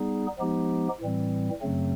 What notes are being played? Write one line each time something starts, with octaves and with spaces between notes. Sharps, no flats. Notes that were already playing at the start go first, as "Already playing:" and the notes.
Already playing: G3 B3 D#4 G#4
F3 G#3 B3 D#4 G4
A2 E3 G3 C4
F#2 C#3 F#3 A3 C4